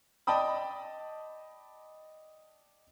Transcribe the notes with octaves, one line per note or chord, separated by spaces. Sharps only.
D5 D#5 G5 A5 B5 D#6